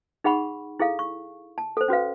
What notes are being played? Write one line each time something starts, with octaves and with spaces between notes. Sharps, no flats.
D#4 G#4 F#5 B5 C#6
E4 G#4 A4 F5
C#6
A5
A4 C5
C#4 F#4 B4 F5